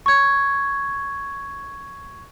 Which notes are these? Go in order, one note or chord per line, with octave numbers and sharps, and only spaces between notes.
C#6 G#6